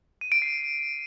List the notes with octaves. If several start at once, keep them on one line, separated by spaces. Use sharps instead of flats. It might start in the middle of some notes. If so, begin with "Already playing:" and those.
D#7
D7
C7